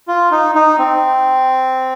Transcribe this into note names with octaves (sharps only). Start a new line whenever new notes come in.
F4
D#4
D#4
C4